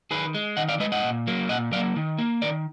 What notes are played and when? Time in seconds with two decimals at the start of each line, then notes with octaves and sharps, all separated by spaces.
0.11 D#3 G#4 B4
0.34 G#3
0.57 D#3 D#5 F#5
0.69 D5 F5
0.80 G#3 B4 D#5
0.92 D#5 F#5
1.04 A#2
1.27 F#3 A#3
1.49 A#2 D#5 F#5
1.72 F#3 D5 F5
1.76 A#3
1.96 D#3
2.19 A#3
2.42 D#3 A#4 D5